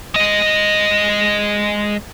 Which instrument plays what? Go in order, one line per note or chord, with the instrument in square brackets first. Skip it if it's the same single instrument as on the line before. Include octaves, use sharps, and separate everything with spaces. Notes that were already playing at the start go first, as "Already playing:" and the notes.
[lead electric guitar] G#3 D#5